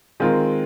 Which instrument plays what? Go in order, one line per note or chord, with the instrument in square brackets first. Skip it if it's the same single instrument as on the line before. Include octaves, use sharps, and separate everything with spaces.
[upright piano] D#3 G#3 C4 F4 A#4